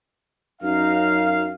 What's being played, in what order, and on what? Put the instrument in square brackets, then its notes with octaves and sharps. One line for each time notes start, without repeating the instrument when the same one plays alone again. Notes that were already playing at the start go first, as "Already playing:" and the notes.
[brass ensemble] F#2 F5 [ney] D#4